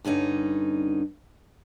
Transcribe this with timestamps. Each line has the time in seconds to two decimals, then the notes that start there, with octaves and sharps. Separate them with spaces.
0.05 G2 D3 C#4 D#4